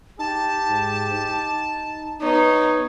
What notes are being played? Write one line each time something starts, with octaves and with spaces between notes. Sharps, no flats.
D#4 G4 A5
G#2
D#4
B3 D#4 C#5